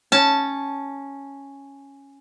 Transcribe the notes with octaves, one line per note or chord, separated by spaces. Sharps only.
C#4 A5